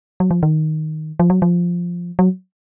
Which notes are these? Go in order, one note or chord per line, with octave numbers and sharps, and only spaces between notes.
F#3
F3
D#3
F3
F#3
F3
F#3